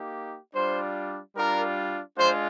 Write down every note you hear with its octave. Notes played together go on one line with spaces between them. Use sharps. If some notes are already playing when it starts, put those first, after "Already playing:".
Already playing: A#3 D#4 G4
G3 D4 F4 C5
G3 D4 F4 A#4
G#3 D4 F4 C5